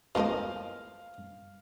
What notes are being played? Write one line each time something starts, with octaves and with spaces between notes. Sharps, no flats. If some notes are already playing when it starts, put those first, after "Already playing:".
B2 E3 F3 G#3 A#3 D#5 F5